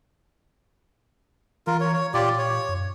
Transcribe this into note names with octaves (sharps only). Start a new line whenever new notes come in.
E3 F4 A#4
C#5
C#5
A#2 F4 G4 D5
C#5
F#2